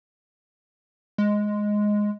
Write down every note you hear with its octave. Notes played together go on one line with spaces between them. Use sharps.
G#3